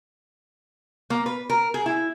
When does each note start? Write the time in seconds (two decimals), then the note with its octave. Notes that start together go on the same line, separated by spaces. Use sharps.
1.10 A#3
1.26 B4
1.50 A#4
1.74 G#4
1.86 E4